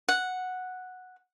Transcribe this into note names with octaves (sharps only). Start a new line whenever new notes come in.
F#5